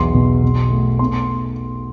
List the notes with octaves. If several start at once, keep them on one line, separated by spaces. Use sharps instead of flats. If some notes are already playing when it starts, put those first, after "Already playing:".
Already playing: B1 E2 C6
B2
B2
A3
B3 C6